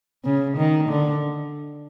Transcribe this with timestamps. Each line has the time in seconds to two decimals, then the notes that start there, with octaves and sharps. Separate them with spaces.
0.24 C#3
0.58 D#3
0.89 D3